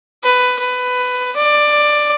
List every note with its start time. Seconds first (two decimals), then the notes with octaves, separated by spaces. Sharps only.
0.23 B4
0.59 B4
1.36 D5